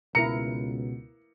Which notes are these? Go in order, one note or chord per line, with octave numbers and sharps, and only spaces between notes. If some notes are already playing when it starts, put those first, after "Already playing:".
C#2 B2 E4 A#4 A#5 C#7